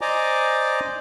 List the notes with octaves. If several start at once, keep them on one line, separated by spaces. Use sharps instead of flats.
C5 D5 D#5 G#5 A#5 D6